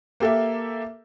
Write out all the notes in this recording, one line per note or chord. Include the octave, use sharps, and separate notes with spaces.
A#3 G4 A4 A#4 E5